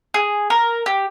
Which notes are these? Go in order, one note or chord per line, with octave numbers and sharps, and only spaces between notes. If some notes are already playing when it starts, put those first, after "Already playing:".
G#4
A#4
G4